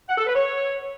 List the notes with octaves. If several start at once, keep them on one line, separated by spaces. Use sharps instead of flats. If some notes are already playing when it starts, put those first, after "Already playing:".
F#5
A4
B4
C#5